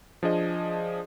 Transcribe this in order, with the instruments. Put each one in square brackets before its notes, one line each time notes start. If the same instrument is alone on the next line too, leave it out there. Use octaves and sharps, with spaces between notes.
[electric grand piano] F3 D4 G#4 D#5